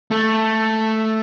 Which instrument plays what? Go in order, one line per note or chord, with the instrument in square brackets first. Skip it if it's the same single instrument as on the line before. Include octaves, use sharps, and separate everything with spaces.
[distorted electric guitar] A3